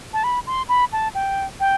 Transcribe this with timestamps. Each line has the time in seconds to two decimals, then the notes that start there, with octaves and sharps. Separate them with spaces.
0.13 A5
0.24 B5
0.47 C6
0.69 B5
0.92 A5
1.15 G5
1.60 G5